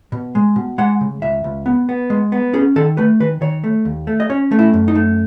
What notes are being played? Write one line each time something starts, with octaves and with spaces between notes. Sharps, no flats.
B2
G#3
B2
G#3 F#5
C#3
C#2 E5
C#2
B3
B3
G#3
B3
C#4 G#4
D#3 A4
A3 B4
D#3 B4
D#3 C#5
A3
D#2
A3
D#5
C#4 C#5
A3
E4
F#2
D#4
A3